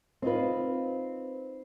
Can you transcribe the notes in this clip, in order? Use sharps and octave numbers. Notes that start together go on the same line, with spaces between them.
C4 D#4 F4 B4